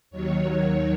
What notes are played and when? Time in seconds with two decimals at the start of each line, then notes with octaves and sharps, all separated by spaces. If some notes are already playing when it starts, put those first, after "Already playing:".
0.10 D#2 D#3 F#3 C#5